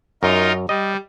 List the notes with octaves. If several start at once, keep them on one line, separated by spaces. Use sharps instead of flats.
F#2 D#4 F4 A#4
G3 D#5